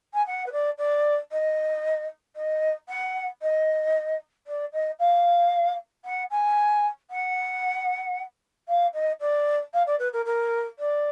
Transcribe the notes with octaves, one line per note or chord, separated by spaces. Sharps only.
G#5
F#5
B4
D5
D5
D#5
D#5
F#5
D#5
D5
D#5
F5
F#5
G#5
F#5
F5
D#5
D5
F5
D5
B4
A#4
A#4
D5